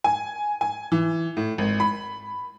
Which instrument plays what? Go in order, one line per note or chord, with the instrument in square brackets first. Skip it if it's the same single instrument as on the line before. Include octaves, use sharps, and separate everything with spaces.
[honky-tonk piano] G#5
G#5
E3
A2
G#1
B5